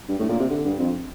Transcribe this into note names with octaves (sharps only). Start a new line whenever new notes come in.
G2
A2
A#2
C3
D3
G2
F2